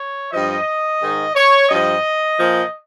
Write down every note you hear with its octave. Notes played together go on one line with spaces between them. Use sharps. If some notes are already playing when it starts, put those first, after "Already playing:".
Already playing: C#5
G2 F3 D#5
G#2 D#3
C#5
G2 F3 D#5
A#2 F3